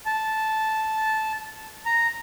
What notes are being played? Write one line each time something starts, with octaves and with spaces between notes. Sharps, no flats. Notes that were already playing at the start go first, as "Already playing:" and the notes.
A5
A#5